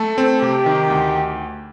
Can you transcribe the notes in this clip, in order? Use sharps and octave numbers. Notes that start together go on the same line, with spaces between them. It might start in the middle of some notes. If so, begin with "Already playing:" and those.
Already playing: A3 A4
C4
C3 G4
D#3
D2